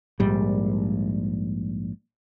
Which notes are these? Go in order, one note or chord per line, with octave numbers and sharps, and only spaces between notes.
A#1 G#2 G3